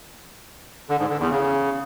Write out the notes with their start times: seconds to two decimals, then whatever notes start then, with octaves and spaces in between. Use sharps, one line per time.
0.89 D3
0.99 G#2
1.10 D3
1.20 E2
1.30 C#3